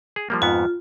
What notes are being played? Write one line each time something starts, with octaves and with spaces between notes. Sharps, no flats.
G#4
F3 G3 A#3
F2 G#2 B3 F4